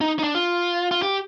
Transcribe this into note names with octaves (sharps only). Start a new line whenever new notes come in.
D#4
D#4
D4
F4
F4
G4